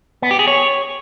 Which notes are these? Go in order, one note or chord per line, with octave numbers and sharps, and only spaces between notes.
B3
G4
G#4
C#5